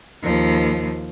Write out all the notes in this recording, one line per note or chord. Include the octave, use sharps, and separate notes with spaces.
D#2 F3